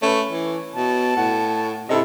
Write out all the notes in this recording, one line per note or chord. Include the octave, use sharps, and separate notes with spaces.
A3 C#4 B4
E3
B2 A5
A2 F#5
C3 E4 A4 D#5